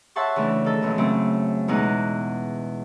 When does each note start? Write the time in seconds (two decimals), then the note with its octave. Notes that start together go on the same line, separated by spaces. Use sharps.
0.16 C#5 E5 F#5 A5 C6 C#6
0.36 C#3 E3 A3 D4
0.64 D#3 A4
0.82 F#2 A#2 C#3 E3
0.98 C#3 F#3 A3 C4
1.68 E2 B2 G#3 D#4 F#6